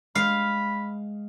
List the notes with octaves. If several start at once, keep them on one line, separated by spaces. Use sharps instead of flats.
G#3 F5 B5